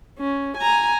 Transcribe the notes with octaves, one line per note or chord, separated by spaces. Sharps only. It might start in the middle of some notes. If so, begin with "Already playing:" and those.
C#4
G#5 A#5